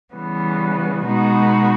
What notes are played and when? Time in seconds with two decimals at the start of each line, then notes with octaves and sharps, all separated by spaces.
0.13 C#3 E3 G3 B3
1.05 B2 G#3 B3 D#4 F#4